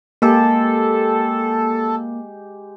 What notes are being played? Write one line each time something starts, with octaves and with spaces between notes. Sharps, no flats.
G#3 A#3 G4 A4